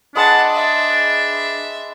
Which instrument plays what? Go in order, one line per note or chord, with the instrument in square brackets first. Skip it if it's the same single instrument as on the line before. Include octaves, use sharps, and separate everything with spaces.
[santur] G#3 B4 D#5 [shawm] D4 [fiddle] F#5 A5
[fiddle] E5